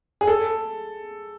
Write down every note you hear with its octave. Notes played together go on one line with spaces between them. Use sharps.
G#4
A4